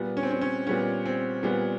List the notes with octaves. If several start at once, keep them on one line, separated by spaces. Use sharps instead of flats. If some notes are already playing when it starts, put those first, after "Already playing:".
Already playing: A#2 G3 B3
C#4
C4
C#4
C#4
A#2 G3 B3 C#4
C4
A#2 G3 B3